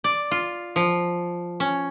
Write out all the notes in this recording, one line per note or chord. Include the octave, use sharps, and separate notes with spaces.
D5
F4
F3
C#4